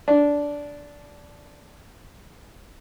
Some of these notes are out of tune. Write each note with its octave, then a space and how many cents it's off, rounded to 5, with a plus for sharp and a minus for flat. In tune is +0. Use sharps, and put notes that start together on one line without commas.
D4 -15